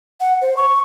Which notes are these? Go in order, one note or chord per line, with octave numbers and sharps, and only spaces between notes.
F#5
C5
C#6